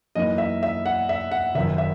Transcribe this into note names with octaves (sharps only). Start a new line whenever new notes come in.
F#2 E3 A#3 D#4 D#5
E5
E5
F#5
E5
F#5
F#1 F#2 D#3 E5
E5